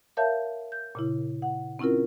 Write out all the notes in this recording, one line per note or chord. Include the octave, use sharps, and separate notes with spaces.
A#4 C#5 E5 F5 A5 G6
G6
A#2 C#3 E4
F#5
C4 C#4 E4 F4 A#4